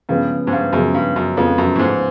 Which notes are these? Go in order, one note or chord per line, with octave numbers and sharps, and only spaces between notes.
G2 C#3 F3 G#3 B3
G#2
G2
F#2 C#3 F3 G#3 B3
G2
F#2
F2 C#3 F3 G#3 B3
F#2
A2
G#2